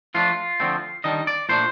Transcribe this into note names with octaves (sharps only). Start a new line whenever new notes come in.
F3 A3 D4 F4
D3 F3 A3 C4
D#3 G3 D4 D#5
D5
A#2 A3 D4 C5